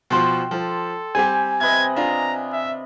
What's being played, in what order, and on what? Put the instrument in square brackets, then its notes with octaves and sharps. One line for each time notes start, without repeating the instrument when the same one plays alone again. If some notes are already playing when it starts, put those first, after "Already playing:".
[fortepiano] B2 F3 [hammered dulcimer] G5 C6
[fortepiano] F3 [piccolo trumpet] A4
[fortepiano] G3 C4 G4 [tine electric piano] G#5
[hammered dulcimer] C3 B4 D#5 [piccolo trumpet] G#6
[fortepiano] D4 F4 [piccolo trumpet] A#5
[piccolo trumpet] E5